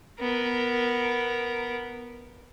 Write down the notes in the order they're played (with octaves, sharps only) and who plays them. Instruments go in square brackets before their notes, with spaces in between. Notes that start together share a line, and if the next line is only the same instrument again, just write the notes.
[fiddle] B3 A#4